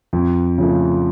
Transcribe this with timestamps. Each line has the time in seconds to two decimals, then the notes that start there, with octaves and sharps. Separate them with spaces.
0.13 F2
0.58 C#3 F3 A3